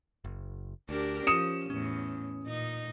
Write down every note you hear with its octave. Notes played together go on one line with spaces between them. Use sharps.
F#1
D2 D4 G4 A#4
F3 C#4 D#6 C#7 E7
E2 A2 C#4
A#2 D#4